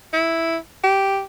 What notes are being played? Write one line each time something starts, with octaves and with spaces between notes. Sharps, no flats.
E4
G4